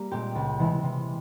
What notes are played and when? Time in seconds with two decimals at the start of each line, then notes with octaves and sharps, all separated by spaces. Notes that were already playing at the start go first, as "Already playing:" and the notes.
Already playing: G3 A#3
0.11 A#2 G#3 C4 G4
0.35 C#2
0.59 C3 E3 G#3 E4
0.83 C3